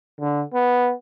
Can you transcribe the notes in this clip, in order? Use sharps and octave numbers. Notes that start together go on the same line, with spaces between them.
D3
B3